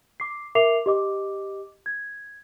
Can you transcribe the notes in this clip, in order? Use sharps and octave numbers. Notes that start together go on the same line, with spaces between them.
D6 C7
A#4 E5 D6 C7 F7
G4 D#5 D6
G#6